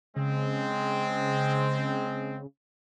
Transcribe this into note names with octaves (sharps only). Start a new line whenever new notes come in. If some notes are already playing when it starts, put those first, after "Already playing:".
C#3 G#3 C4